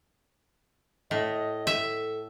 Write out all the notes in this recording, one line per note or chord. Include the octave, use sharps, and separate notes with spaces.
A2 D#5
A4 E5